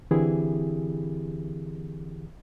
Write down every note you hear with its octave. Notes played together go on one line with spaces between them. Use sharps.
D3 E3 C4 E4 G4 G#4